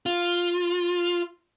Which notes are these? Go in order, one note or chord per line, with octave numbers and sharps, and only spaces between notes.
F4